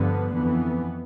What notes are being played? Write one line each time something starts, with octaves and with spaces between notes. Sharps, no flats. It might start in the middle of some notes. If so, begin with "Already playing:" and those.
Already playing: G2 D3 F3 B3
F2 E3 B3